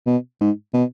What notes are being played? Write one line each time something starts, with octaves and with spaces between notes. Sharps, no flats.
B2
G#2
B2